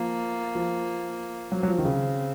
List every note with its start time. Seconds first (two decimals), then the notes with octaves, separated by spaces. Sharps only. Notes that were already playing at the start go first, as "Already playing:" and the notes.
Already playing: F3 A#3
0.55 F3
1.52 F#3 C4
1.63 F#3
1.68 F3
1.78 D#3
1.85 C#3